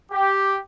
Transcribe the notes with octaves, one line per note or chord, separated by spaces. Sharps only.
G4